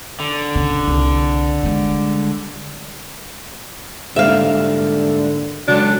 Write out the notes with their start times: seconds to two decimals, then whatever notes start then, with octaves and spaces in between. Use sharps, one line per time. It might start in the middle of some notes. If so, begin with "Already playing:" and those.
0.20 D3
0.55 C#3
0.88 C2
1.63 G3 G#3
4.16 G#2 D3 G3 A#3 E5 F5
5.68 C#3 F#3 G#3 D4 A4